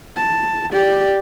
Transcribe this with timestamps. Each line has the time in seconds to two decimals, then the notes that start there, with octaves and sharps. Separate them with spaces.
0.17 A5
0.73 G4 D5